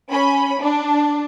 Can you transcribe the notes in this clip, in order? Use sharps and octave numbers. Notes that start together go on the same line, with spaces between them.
C#4 B5
D4